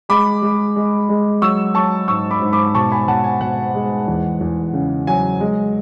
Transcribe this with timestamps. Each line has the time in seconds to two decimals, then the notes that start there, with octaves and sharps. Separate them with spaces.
0.09 G#3 B5 D6
0.42 G#3
0.76 G#3
1.09 G#3
1.42 F#3 C#6 E6
1.75 F#3 A5 C#6
2.08 G#2 C#6 E6
2.31 B5 D6
2.42 G#2
2.52 B5 D6
2.74 B2 A5 C#6
2.92 G#5 B5
3.08 B2 F#5 A5
3.24 G#5
3.41 B2 F#5
3.74 G#3
4.08 E2
4.41 E2
4.73 C#3
5.07 F#3 G#5
5.40 G#3